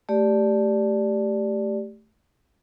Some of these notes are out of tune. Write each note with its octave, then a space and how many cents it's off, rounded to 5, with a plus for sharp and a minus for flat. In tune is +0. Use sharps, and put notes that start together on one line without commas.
A3 +0 G4 +0 D5 +0